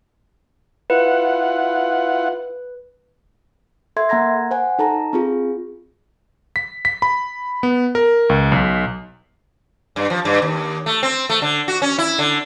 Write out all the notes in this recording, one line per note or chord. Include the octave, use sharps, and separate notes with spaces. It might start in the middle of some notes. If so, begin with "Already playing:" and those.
E4 F4 B4 F#5
A4 E5 C6 G#6
A#3 F#5 A#5 G#6 A#6
C5 F#5 G#5
D#4 A4 A5 A#5
C4 F4 G#4
B6
B6
B5
B3
A#4
C#2
B1
G2
F3
G2
D#2
A3
C4
A3
D3
F#4
C#4
E4
D3